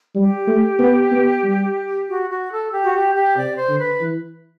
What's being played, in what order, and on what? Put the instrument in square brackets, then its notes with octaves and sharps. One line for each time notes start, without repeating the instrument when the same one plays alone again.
[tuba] G3 [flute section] G4
[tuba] A3
B3
B3
G3
[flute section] F#4
F#4
A4
G4
F#4
G4
G4
[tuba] C3 [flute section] D5
[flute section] C5
[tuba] D3
[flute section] B4
[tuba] E3